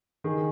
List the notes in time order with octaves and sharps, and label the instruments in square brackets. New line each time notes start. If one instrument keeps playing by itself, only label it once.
[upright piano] D#3 G#4